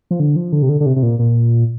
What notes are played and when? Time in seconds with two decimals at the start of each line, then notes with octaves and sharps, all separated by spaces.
0.11 F3
0.20 D3
0.36 F3
0.52 D3
0.62 C3
0.69 D3
0.80 D3
0.86 C3
0.96 C3
1.03 A#2
1.19 A#2